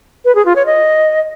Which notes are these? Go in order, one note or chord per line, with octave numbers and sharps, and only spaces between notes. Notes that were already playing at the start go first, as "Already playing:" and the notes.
B4
G#4
F4
C#5
D#5